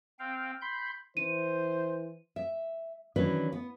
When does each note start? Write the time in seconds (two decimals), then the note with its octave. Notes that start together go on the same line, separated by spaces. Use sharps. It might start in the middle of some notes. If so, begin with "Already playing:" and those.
0.19 C4 F5 G5
0.62 B5 C6 G6
1.17 E3 C5 D#7
2.36 E5
3.16 D#3 E3 F#3 C#4 D4 B4
3.52 B3